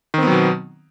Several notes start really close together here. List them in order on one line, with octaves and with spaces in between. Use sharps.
D#3 C4 B3 F#3 B2